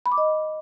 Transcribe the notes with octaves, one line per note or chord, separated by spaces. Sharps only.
B5
D6
D#5